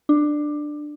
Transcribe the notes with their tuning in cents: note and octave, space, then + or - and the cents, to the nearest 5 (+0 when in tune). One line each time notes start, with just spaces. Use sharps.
D4 +15